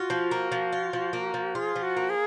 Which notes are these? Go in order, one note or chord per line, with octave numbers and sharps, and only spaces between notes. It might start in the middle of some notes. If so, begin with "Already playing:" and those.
Already playing: F4 F#4
F3
A#3
F3
F4
F3
A#3
F3
F4 G#4
F3
F#4
A#3
G#4